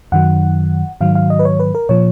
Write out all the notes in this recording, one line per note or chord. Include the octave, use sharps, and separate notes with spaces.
F#2 D#3 F#3 F#5
G#2 D#3 F#3 F5
F5
D#5
B4
C#5
B4
A#4
A#2 F3 C#5